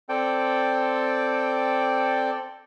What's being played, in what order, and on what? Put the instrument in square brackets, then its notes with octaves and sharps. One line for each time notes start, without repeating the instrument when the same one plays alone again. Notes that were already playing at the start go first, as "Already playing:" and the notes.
[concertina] C4 A4 D5 G5